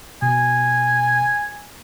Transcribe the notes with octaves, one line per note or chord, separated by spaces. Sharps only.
B2 G#5